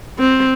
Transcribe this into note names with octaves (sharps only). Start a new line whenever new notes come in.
C4